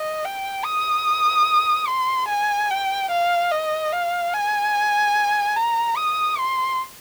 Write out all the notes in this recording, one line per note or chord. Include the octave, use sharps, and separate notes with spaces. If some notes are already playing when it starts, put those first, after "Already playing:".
Already playing: D#5
G5
D#6
C6
G#5
G5
F5
D#5
F5
G#5
A#5
D#6
C6